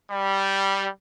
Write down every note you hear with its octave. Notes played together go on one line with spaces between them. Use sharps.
G3